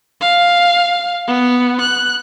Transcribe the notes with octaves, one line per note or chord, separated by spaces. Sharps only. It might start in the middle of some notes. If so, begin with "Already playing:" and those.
F5
B3
F#6